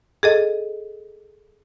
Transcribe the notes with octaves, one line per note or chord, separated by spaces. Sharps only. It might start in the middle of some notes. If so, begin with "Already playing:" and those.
G#4 A4 D#5